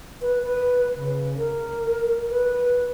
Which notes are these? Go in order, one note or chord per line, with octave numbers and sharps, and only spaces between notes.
B4
B4
C#3
A#4
B4